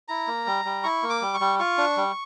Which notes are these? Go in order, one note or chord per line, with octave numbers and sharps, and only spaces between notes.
E4 A#5
A#3
G3
G3
E4 C#6
A#3
D6
G3
C#6
G3
F4 C#6
D4
G3